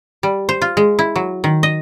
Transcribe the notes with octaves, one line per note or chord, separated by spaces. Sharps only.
G3
C5
F4
G#3
E4
F#3
D#3
D#5